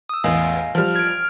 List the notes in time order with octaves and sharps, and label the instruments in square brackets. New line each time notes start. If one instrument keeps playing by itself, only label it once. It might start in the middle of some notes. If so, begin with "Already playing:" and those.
[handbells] D#6 E6
[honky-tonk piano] A1 E2 [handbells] D#5 F5 G#5
[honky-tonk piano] F3 G3 [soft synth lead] F6
[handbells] G#6 D7